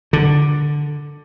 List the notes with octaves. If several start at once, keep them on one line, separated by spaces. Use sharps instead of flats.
D3